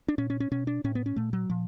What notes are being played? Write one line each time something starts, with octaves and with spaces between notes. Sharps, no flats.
D4
A#2 C#4
C#4
C#4
B2 C#4
D4
A2 C#4
B3
C#4
A#2 A3
F#3
A#2 F3